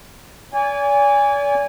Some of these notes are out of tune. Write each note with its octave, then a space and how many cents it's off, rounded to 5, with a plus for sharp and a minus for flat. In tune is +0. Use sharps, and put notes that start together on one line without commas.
D5 -40 G#5 -20